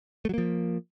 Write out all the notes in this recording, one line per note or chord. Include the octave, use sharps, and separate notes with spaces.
F3 F#3 A3 A#3